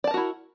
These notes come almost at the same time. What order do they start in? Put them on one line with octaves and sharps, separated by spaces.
D5 A5 A#4 F#4 E4